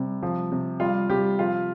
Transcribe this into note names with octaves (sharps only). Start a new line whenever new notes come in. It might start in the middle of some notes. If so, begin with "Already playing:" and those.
Already playing: C3 G3
F3
C3
G3 F4
C3 G3 G4
F3 F4